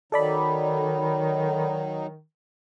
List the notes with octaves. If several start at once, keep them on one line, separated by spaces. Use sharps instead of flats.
D#3 F#3 D#4 A4 D5 B5